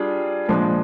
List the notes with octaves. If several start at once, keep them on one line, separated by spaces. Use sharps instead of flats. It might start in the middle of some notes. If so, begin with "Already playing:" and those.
Already playing: G3 D4 F4 G#4
A#2 F3 G#3 D4